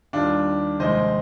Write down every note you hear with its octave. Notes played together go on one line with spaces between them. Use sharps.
D#2 D#3 G3 D4 F4
F1 D#2 D#3 G#3 C5 D#5